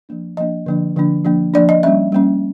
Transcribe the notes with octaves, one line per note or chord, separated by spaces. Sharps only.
F3 A#3 D4
F3 A#3 D4 D#5
D3 F3 A#3 D4
D3 F3 A#3 D4
F3 A#3 D4
F3 A#3 D4 D5
D#5
G3 A#3 C#4 E5
G3 A#3 C#4